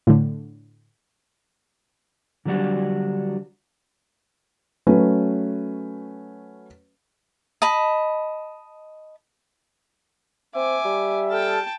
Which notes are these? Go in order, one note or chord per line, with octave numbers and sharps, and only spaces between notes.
A2 D3
D3 F#3 G3 D4 F#4
F#3 A3 C#4 B4
D#5 A5 B5
C4 E5 G#5 D6
G3
A4 G5 A5 F6